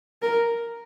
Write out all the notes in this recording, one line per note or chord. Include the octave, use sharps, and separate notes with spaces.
A#4